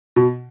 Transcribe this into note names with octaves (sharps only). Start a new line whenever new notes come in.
B2